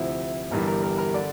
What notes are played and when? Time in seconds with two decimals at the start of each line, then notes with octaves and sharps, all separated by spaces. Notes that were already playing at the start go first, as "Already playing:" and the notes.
Already playing: D2 C3 F3 E4
0.51 G1 G2 E3 G3 A#4
0.67 A#4
0.83 A#4
0.98 A#4
1.14 D3 D5